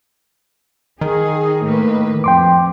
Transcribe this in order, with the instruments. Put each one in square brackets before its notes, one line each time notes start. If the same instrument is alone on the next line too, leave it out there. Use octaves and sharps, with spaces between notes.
[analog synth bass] D#3 [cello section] D#4 G#4
[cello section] A2 A#3 B4
[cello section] F2 [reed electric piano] G5 C6 D6